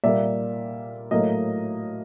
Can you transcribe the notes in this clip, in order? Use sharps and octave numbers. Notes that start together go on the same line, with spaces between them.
A#2 G3 A#3 D5 E5
A2 F#3 A#3 D#5